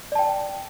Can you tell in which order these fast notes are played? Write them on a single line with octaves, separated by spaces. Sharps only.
D5 A5 G5